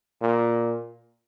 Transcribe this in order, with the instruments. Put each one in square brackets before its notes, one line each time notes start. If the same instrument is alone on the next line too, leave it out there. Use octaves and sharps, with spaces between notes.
[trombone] A#2